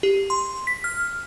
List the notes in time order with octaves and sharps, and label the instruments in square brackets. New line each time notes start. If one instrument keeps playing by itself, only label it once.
[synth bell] G4
C6
B6
F6